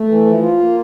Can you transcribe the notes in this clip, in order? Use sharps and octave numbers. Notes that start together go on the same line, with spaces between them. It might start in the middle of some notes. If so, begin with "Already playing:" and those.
Already playing: A3
E3
F3
F4
A#3